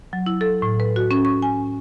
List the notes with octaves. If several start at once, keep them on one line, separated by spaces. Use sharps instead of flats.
F#3
E4
A4
A2
B4
F#4
C#4
C#6
G#5